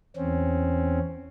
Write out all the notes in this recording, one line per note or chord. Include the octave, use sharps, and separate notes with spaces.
E2 C4 C#4